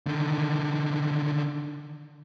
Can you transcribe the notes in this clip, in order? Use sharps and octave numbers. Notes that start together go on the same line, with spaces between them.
D3 D#3